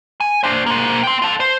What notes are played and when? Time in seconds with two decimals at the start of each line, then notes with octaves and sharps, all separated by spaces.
0.20 G#5
0.43 D4 C5
0.66 A#3 C5
1.03 G5 C6
1.22 F4 A4
1.40 C5